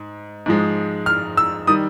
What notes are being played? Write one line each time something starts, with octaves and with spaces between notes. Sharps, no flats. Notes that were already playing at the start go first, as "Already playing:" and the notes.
Already playing: G#2
G#2 F3 G#3
F6
E6
D#3 G3 D#6